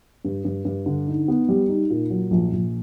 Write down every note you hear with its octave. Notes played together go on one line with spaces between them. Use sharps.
G2
G2
G2
D3
D#4
B3
G3
D#4
A#2
F#3
A#1
A#1